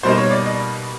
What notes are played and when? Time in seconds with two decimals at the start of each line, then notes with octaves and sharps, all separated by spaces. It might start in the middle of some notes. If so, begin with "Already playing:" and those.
0.03 B2 G3 A#3 D#4 C5
0.18 C#5
0.31 D5
0.46 D#5